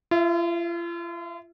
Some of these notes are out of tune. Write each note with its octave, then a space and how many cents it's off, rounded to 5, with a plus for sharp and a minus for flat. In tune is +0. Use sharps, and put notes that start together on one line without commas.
F4 -40 E5 +0